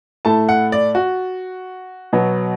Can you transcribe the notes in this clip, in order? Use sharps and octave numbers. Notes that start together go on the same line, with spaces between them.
A2 A3 A5
F#5
D5
F#4
B2 F#3 B3